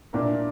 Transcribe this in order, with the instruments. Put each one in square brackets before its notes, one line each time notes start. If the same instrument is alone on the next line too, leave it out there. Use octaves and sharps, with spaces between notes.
[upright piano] A#2 A#3 E4 A#4 [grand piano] D4